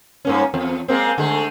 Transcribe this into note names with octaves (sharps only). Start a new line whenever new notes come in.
G2 A#3 C#4
E2
G#3 A#3 C4
D3 G#3 A3